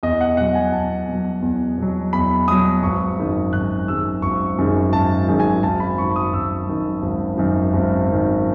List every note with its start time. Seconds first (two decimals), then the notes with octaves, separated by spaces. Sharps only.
0.03 E2 D#5
0.21 F#5
0.37 B2 F#3 F#5
0.55 G#5
0.72 E2 A5
1.08 B2 F#3
1.42 E2
1.78 B2 F#3
2.13 E2 B5
2.48 B2 F#3 D#6
2.83 G#1 C#6
3.18 F#2 D#3 G#3
3.53 G#1 F#6
3.88 F#2 D#3 G#3 E6
4.22 G#1 C#6
4.58 F#2 D#3 G#3
4.92 G#1 A5
5.28 F#2 D#3 G#3
5.40 G#5
5.63 G#1 A5
5.80 B5
5.98 F#2 D#3 C#6
6.16 D#6
6.33 G#1 E6
6.67 F#2 D#3
7.02 G#1
7.38 F#2 D#3
7.74 G#1
8.08 F#2 D#3